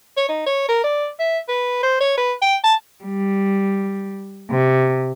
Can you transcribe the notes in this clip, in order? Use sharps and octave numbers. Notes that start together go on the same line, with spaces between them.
C#5
D#4
C#5
A#4
D5
E5
B4
C5
C#5
B4
G5
A5
G3
C3